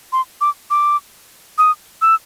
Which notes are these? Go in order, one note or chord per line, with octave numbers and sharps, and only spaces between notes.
C6
D6
D6
D#6
E6